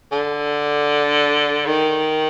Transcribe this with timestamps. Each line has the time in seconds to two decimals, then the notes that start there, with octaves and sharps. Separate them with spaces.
0.12 D3
1.67 D#3